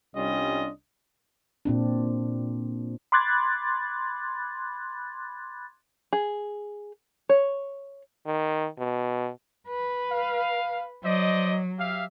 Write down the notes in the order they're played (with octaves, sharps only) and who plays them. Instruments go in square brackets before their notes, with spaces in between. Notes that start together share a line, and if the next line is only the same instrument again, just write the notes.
[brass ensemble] C2 G3 C#4 D4 F4 D#5
[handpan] A#2 C4 D4
[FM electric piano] B5 C6 D6 F#6 G#6 A6
[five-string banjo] G#4
C#5
[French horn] D#3
B2
[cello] B4
[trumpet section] F5
[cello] F#3 [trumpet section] C5 D5 D#5
[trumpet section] G4 E5 F5